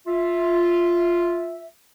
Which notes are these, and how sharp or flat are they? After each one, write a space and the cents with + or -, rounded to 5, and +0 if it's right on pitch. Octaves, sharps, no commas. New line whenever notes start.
F4 +0 E5 -5